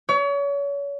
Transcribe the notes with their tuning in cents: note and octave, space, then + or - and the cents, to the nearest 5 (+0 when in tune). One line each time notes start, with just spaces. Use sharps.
C#5 +35